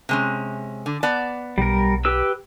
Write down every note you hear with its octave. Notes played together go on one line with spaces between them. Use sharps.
C3 G#3 C#4
D3
B3 D5 A5
B1 G3 A#4
G4 B4 E6